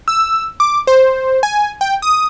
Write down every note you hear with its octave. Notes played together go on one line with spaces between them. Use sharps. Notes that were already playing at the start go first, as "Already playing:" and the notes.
E6
D6
C5
G#5
G5
D#6